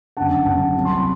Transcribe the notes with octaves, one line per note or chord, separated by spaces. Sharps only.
F#1 F#2 D3 F#5 A5
F#1 F#2 D3 F#5 A5
C2 C3 F#3
C6
B5